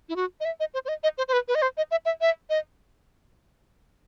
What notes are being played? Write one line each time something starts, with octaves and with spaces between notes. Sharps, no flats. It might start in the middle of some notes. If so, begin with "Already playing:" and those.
E4
F#4
D#5
E5
D#5
C5
C5
D#5
D#5
C5
C5
B4
B4
D#5
C5
D#5
E5
E5
E5
D#5